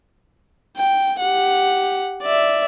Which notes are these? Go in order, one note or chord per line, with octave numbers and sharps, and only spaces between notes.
G5
G4 F#5
D5 E5